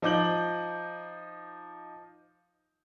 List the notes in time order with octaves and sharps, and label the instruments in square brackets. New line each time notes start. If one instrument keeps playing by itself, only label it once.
[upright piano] F3 D#4 D6 G6 F#7